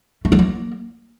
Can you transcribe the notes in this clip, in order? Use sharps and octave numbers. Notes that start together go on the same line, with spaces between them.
A3
F#3
A#3